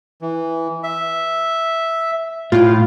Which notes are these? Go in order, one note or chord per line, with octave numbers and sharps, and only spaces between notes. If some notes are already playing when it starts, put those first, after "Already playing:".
E3
E5
A2 F4